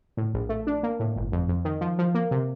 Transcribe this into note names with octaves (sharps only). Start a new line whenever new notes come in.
A2
A#1
A3
D4
A#3
A2
G1
F2
F2
D#3
F3
F3
A#3
C3